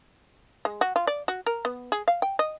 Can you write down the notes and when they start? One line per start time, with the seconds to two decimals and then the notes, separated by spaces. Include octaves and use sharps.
0.65 G#3
0.81 F#4
0.96 F4
1.07 D5
1.28 F#4
1.46 A#4
1.65 B3
1.92 G#4
2.08 F5
2.22 G5
2.39 D#5